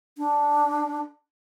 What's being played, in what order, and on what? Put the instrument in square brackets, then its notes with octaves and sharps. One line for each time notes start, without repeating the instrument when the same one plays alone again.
[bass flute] D4